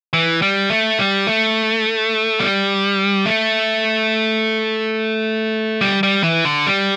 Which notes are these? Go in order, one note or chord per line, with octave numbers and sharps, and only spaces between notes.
E3
G3
A3
G3
A3
G3
A3
G3
G3
E3
D3
G3